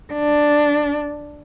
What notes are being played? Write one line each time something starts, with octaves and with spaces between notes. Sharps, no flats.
D4